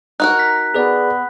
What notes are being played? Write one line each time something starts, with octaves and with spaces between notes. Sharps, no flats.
D#4 F#4 A#4 F#6
B6
B3 G#4 B4 D5